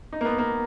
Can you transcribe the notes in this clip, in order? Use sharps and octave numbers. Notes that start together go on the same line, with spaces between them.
D#4
A#3
B3
A#3